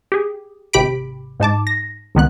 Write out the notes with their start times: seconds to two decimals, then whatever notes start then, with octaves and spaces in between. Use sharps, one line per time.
0.12 G4 G#4
0.73 G#1 C3 G4 B5 B6 D7
1.40 G#2 D#4 A5 D6
1.67 A#6
2.15 C#2 D#3 B3 F#6